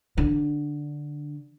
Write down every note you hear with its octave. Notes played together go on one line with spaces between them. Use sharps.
D3